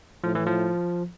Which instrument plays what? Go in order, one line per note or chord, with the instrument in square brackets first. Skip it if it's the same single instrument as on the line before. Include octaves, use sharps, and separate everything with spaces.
[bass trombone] A2 [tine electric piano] F3
[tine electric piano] E3
F3